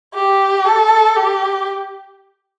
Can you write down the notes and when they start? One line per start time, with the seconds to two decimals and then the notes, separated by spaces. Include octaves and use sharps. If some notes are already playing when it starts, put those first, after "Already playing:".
0.15 G4
0.65 A4
1.16 G4